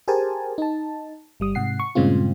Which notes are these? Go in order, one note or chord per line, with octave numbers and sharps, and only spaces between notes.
G4 G#4 A#4 C5 G#5 A5
D#4 A5
G1 G3 D#6
G#2 C3 F#5 C7
C#6
G2 A#2 C#3 G#3 C4 F4